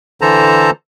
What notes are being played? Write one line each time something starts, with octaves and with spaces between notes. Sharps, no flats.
D3 E3 A4 C5 A5 A#5